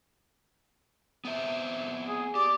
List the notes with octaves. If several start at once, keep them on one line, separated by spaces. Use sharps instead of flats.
B3 C4 E5
G#4
G4 D5